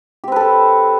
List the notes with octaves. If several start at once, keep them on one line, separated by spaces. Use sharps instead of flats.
C4 G4 A4 B4